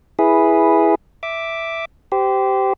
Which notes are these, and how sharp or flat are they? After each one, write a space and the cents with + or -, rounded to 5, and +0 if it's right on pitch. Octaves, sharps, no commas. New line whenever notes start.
E4 +0 G#4 +0 B4 -5
E5 +0 D6 +0
G4 -15 C5 -25